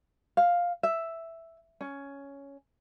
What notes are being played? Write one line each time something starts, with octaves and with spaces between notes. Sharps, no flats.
F5
E5
C#4